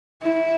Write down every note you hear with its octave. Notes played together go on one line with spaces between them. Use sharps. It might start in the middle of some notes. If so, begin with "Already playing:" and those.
E4